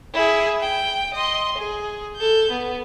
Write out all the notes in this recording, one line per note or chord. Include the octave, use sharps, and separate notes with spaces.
E4 G#4
G5
D#5 C6
G#4
A4 G6
B3